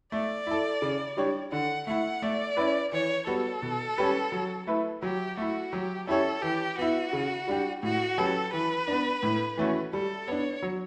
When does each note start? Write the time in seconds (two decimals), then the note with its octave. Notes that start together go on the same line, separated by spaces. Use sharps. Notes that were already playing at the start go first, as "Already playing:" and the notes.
0.12 A3 D5
0.47 E4 A4
0.82 C#3
1.17 G3 D4 G4 C#5
1.52 D3 F#5
1.87 A3 E4 F#5
2.22 A3 D5
2.57 C#4 E4 B4
2.92 E3 C#5
3.27 G3 B3 F#4 A4
3.62 B2
3.98 G3 C#4 G4 B4
4.32 F#3
4.67 A3 E4 B4
5.02 F#3 G4
5.37 A3 E4 F#4
5.72 F#3 G4
6.07 C#4 E4 G4 A4 C#5
6.42 E3 G4
6.78 B3 E4 F#4
7.13 C#3
7.48 G3 D4 G4
7.83 A2 F#4
8.17 F#3 C#4 G4 A4 B4
8.53 E3 B4
8.88 B3 D4
9.23 A2
9.57 E3 A3 C#4 F#4
9.93 G3 A4
10.28 B3 D4 C#5
10.62 F#3